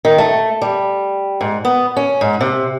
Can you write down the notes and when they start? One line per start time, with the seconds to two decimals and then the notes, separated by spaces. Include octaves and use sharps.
0.05 D#3
0.18 A3
0.62 G3
1.41 G#2
1.65 B3
1.96 C#4
2.21 G#2
2.41 C3